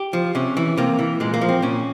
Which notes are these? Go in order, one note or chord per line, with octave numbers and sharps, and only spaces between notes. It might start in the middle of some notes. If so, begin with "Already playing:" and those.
Already playing: G4
F3
C3 C#4
E3
C3 A#3
E3
A#2 G#3
A#3
F3
C4
A#2 C#4